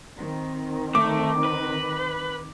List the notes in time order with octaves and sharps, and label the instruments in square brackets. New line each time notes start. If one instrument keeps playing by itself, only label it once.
[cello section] D#3 C4
[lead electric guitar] A3 [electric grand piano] D6
[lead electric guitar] B4